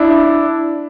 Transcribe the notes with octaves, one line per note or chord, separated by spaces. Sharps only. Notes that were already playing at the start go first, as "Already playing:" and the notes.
Already playing: D4 E4